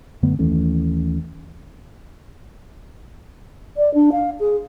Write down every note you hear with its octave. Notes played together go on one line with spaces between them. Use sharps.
F#2 D3 A3 B3
D#2 E3 A3 C#4
D5
D4
F5
G#4